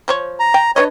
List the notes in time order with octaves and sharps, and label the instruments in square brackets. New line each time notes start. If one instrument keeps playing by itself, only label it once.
[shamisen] F3 C5 C#5
[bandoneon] A#5
[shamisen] G5
[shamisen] D4 B4 D#5 [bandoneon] C#5